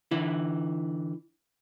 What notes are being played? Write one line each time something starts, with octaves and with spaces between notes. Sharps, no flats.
D3 E3 E4